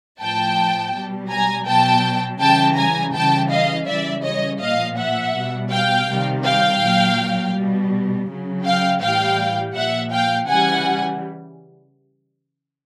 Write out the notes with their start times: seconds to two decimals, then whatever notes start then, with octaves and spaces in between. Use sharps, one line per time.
0.21 A2 F3 G5 A5
0.94 B2 G3
1.30 G#5 A#5
1.67 B2 F#3 G5 A5
2.40 C#3 E3 G3 G5 A5
2.77 G#5 A#5
3.14 C#3 E3 G3 G5 A5
3.50 D#5 F5
3.87 C#3 E3 G3 D5 E5
4.24 C#5 D#5
4.60 A#2 F3 D#5 F5
4.97 E5 F#5
5.34 B2 G3
5.71 F5 G5
6.08 C3 D#3 G3
6.44 F5 G5
6.81 A#2 F#3
7.55 B2 G3
8.28 C#3 F#3
8.65 F5 G5
9.01 A2 E3 G3 F5 G5
9.75 A#2 F3 E5 F#5
10.12 F5 G5
10.48 C#3 E3 G3 F#5 G#5